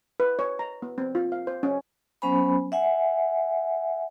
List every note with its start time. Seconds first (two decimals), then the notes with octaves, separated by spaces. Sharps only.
0.20 B4
0.39 C#5
0.59 A#5
0.82 B3
0.98 C4
1.15 F4
1.32 F5
1.47 C5
1.63 C#4
2.22 F#3 B3 C#4 C5 G#5 B5
2.72 E5 F#5 G#5